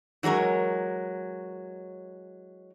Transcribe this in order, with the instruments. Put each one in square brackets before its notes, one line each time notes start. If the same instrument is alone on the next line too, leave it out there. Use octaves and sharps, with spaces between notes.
[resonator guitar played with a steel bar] E3 F#3 G#3 A#4 C#5